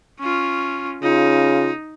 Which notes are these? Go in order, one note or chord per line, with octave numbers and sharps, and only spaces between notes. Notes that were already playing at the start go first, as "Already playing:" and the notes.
C#4 F4 C#6
C#3 D#4 F4